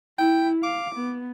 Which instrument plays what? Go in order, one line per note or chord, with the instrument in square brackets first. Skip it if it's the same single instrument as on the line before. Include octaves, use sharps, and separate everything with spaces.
[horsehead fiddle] E4 [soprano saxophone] G5
[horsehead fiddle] F5 [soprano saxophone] D6
[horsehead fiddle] B3